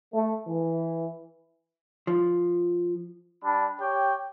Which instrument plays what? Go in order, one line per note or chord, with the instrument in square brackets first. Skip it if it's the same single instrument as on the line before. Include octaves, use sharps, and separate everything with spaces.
[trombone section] A3
E3
[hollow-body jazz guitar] F3
[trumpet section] G3 D4 B5
G4 C#5 G5